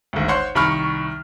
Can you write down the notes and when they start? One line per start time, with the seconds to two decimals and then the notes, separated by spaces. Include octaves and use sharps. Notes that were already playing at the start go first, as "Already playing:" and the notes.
0.13 G#1 D2
0.28 C5 C#5 F#5 C6
0.55 C2 D#3 B5 C#6 F6